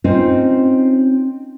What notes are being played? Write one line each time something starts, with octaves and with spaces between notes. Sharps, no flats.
C4 C#4 D#4 F4 C5